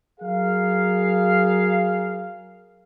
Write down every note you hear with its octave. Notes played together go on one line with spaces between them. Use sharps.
F#3 G#4 A#4 F5